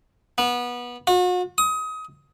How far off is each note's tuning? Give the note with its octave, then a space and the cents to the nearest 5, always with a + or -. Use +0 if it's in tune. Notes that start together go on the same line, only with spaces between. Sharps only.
B3 -20
F#4 -40
D#6 +25